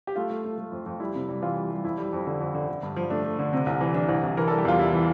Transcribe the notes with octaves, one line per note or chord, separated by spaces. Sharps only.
G4
A3 F4
A3
A3
A3
F2
F2
G3 E4
C3
G3
E3 F4
G3
G3
F2 E4
G3
F2
D3
F2
D3
D3
G2
F3
A3 D4
A3
D3
C3
C2
E3
E3 D4
C2
C2
E3 A#4
G3 A4
G4
E2 F4
G3 E4
E3